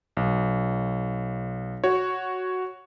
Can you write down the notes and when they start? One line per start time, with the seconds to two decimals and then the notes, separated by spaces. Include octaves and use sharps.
0.17 B1
1.84 F#4 C#5